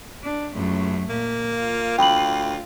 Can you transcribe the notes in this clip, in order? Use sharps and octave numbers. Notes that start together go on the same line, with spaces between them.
D4
C#2 F#2 A3
A#2 A#3
F4
D2 G5 B5 F#7